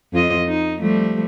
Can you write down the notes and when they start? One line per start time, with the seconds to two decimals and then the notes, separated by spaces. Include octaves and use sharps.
0.13 F2 F4 D#5
0.48 D#4
0.80 F3 G3 A3